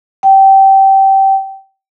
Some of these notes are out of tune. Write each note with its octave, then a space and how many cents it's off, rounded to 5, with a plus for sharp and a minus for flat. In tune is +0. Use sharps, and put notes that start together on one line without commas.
G5 -20